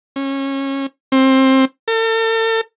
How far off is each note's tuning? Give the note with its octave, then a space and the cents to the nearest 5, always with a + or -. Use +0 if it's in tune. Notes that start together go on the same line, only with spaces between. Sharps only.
C#4 -25
C4 +20
A4 +40